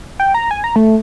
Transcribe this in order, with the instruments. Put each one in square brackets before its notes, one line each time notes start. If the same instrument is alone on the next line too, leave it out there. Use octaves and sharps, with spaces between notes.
[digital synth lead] G5
A#5
G#5
A#5
A3